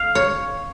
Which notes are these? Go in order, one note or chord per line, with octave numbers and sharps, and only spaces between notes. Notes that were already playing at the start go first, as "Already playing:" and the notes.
Already playing: F5
C#5